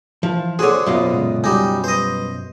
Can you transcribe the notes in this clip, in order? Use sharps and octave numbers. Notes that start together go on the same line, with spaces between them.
E3 F3 E4
D3 F#4 G#4 C5 C#5 C6
F#2 B2 F#3 F4 C5
A#2 C#3 G#3
G3 D#4 F#4 G#5
G3 B4 C5 D#5